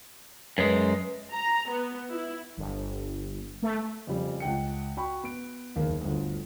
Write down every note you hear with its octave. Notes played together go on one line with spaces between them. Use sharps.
F#2 G#3 B4
A#5
B3
E4
G1
A3
F2 C#3 F3 G3
C#2 F#5 G5 C#7
F#4 G5 B5 C#6
B3 D7
F#1 D#2 A#3
G1 D2